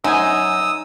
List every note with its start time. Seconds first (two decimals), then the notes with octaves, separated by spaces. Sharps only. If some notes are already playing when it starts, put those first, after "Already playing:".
0.04 F#2 D#4 G#5 D#6 E6